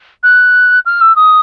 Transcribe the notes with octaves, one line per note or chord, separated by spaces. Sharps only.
F#6
F6
E6
D#6